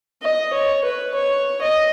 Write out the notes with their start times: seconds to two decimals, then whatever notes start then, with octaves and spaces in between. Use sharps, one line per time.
0.22 D#5
0.53 C#5
0.84 B4
1.15 C#5
1.62 D#5